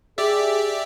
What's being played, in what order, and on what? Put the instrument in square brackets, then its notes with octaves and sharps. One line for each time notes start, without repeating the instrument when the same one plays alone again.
[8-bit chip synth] G4 D5 E5 [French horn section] G#4